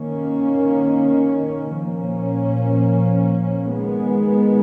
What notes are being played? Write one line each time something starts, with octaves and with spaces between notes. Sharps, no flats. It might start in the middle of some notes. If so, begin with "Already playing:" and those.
Already playing: D#3 A#3 C#4
A#2 F3 A#3 C#4
D#3 G#3 B3